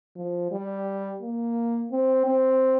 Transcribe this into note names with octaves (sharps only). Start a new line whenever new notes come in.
F3
G3
A#3
C4
C4